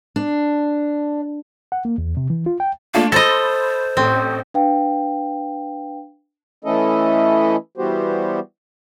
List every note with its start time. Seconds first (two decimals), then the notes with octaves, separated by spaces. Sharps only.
0.16 D4
1.72 F#5
1.85 A#3
1.98 E2
2.17 C3
2.30 E3
2.46 F4
2.60 G5
2.94 A3 A#3 D4 F4
3.12 A4 C5 D#5 B5 C6 A6
3.97 A1 A2 C4
4.54 D4 B4 F5 G5
6.64 E3 A3 C#4 E4 A4 D#5
7.77 E3 G3 B3 F#4 G4 C5